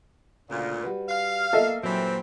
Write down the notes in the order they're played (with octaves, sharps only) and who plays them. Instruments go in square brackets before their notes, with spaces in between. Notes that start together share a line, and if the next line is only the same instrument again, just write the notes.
[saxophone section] D2 A#2 [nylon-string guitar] C#3
[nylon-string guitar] G3 F#4 B4
[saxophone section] F5
[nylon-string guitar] A#3 A#4 [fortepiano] A4 D#5 E5
[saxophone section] G2 E3 C4 [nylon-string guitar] A#2 F#3 A#3